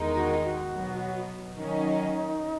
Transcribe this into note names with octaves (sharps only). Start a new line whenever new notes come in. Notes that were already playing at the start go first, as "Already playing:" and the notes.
Already playing: E2 D#3 G#3 D#4 A#4
F#4
F#4
B2 F#3 B3
D#3 F#3 C#4 D#4